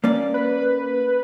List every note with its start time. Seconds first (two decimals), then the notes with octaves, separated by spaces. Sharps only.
0.04 A#3 C#4 D5
0.34 B4